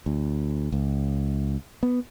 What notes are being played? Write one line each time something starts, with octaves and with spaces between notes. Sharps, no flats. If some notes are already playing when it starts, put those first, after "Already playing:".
D2
C#2
B3